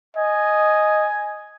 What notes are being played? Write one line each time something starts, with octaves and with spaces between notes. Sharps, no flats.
D#5 G#5